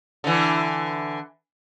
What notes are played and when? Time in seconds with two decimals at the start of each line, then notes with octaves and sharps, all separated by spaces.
0.24 D3 E3